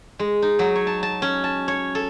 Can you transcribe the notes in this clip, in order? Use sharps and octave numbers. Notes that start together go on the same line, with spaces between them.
G#3
D#4
F#3
C#5
A5
A5
C#4
A5
C#5
A4